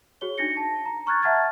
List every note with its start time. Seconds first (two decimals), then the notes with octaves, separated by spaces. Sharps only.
0.21 F#4 G#4 C#5 G7
0.38 D4 D#4 A#6 C#7
0.57 A5
0.85 A#5
1.06 A#5 C#6 F6 F#6 G#6 A6
1.22 E5 F#5 A5 F6 G#6 A6